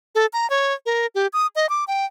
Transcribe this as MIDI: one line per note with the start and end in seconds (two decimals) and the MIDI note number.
0.15 0.26 69
0.33 0.49 82
0.50 0.73 73
0.86 1.06 70
1.15 1.27 67
1.33 1.47 87
1.56 1.69 75
1.69 1.84 86
1.88 2.05 79